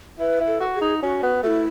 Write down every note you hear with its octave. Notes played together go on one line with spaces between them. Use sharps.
E4 B4
E4
A4
F#4
G#4
D#4
C#4 F#4
B3
A3 E4 F#4